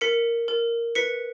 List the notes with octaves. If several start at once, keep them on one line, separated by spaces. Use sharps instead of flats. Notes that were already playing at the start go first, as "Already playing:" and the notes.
A#4 B6 C#7
A#4
B4 B6 C#7